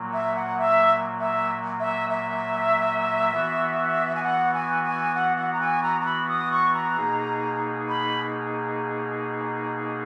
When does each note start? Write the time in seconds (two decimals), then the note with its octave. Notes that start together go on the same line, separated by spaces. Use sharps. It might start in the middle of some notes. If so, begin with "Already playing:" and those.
Already playing: A#2 F#3 A#3
0.13 E5
0.35 F#5
0.58 E5
1.19 E5
1.80 E5
2.10 E5
3.31 E3 B3 F#4
4.15 G#5
4.23 F#5
4.54 G#5
4.83 G#5
5.15 F#5
5.37 F#5
5.53 A#5
5.60 G#5
5.83 A#5
6.01 A#5
6.05 B5
6.28 D#6
6.52 C#6
6.74 A#5
6.96 B2 A#3 D#4 G#4
7.88 B5